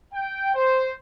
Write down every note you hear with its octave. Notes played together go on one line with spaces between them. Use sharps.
G5
C5